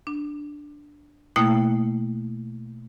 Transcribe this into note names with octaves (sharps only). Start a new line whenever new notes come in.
D4
B2 A3 A#3 E4 G5 F#6